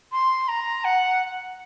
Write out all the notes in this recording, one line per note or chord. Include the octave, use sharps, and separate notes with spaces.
C6
A#5
F#5